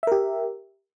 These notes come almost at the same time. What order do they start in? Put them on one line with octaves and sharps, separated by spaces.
E5 A#4 G4